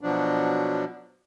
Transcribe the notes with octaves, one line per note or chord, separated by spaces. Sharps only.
B2 F3 F#3 D4